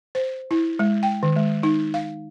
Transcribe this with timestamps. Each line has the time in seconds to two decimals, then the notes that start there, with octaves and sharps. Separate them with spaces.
0.15 C5
0.51 E4
0.79 G#3
1.03 G5
1.23 D#3
1.36 G#3
1.63 D#4
1.94 F5